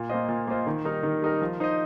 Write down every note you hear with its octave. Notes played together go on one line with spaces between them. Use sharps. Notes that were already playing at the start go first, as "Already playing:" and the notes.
Already playing: A#2
A#3 F4 C5 D#5
A#2
A#3 F4 C5 D#5
D#3
G3 D#4 A#4
D#3
G3 D#4 A#4
F3
D#4 C5 D#5